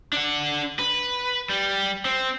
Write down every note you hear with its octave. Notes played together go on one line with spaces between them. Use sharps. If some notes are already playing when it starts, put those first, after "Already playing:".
D4 F#5
B4
G3
C4